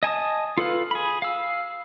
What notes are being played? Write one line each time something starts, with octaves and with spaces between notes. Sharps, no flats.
D#5 G#5 A5 D#6
F4 A4 B4 F5
G#4 B5
F5 E6